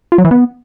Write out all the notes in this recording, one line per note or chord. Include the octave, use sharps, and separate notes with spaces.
F4
F#3
E3
B3